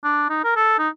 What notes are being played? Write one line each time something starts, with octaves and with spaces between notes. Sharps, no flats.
D4
D#4
A#4
A4
D#4